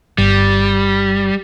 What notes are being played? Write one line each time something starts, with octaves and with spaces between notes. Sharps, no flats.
G1 G3